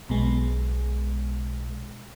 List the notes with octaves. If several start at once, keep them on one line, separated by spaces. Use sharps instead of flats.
B1 B2 G#3